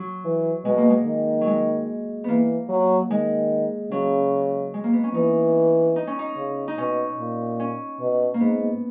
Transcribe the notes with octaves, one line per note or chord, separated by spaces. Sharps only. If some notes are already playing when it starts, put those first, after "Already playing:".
Already playing: F#3
E3
B2 G#3
A#3
G#3
D#3
F#3
G#3
E3 A#3 B3
F#3
D#3 G#3
C#3 F#3
G#3
A#3
B3
C#4
E3 D#4
D#4
C#4
D#4
C#3
D#4
B2 C#4
A#2
C#4
B2
A#3
G#2 B3